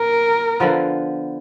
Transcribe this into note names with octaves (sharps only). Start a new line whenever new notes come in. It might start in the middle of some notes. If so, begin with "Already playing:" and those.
Already playing: A#2 A#4
D3 F3 B3